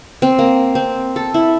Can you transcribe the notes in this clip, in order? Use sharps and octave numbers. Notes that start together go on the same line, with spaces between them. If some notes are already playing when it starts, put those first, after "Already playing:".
C4
A#3
C4
A4
E4